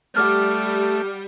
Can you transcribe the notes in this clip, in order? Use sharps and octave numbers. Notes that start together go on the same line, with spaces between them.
G3 A3 F#5 D6 F6